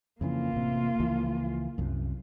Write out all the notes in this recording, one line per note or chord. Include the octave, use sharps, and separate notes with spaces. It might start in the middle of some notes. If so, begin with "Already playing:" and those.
F2 C#3 E3 A#3 F4
A1 C3
C#2 E3 F3
C2 F#2